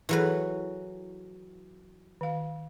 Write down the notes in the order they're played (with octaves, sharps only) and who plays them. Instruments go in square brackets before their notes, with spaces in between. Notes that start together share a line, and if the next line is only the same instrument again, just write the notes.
[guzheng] E3 F#3 B4 [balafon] E4 G#4 A4
[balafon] D#3 F5